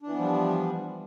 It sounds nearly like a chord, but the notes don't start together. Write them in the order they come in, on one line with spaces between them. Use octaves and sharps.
D4 E3 B3 F3 G3